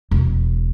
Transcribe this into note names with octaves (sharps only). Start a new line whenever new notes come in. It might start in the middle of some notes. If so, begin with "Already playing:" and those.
E1